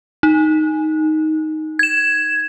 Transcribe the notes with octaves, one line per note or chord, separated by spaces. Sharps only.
D#4
G#6 E7